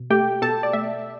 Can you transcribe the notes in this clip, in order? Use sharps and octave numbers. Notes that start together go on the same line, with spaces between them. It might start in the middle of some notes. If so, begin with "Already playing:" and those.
Already playing: B2
A3 G4 G5
B2 A4 A5
D5
A3 E5